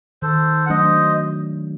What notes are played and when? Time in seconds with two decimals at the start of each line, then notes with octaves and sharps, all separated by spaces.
0.22 D#3 A4 C5
0.66 F#5
0.70 F#3 A3 D4 C5 D#5